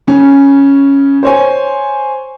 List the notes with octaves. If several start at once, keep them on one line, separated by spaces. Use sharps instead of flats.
C#3 C#4
C5 C#5 G#5